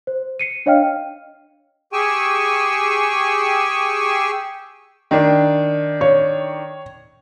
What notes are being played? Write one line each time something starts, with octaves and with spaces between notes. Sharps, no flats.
C5
C7 C#7 D#7
D4 C#5 D#5 F5 G5 F6
G4 G#4 G5 G#5 C#6 E6
D#3 D4
C#5